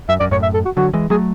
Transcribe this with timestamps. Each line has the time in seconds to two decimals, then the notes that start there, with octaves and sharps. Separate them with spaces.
0.09 F#2 E5
0.20 F#2 D5
0.31 F#2 A2 C#5
0.43 E5
0.54 A4
0.65 F#4
0.77 D3 F#3 F#4
0.93 E3 G#3
1.10 F#3 A3 G#4